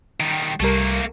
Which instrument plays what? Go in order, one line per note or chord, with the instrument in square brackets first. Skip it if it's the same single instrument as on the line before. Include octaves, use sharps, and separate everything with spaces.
[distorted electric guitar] D#3 G3
[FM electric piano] C2 G3 A#4 [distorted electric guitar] A3 A#3